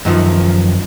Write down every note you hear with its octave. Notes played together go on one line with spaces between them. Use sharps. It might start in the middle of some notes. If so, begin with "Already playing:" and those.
F#2 D#3 F3